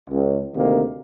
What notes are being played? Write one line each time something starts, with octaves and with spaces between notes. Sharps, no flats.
C#2
D2 C3 D#3 A#3